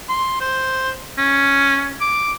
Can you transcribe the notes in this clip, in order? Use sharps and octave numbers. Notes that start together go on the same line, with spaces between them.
C6
C5
C#4
D6